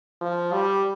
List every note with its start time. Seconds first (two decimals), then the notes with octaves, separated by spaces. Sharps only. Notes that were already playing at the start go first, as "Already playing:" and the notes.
0.21 F3
0.53 G3